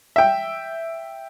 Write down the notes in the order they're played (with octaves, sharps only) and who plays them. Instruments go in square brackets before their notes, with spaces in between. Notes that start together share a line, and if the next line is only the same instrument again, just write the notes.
[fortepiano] E5 G5